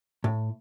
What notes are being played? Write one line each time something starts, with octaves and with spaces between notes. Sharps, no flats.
A2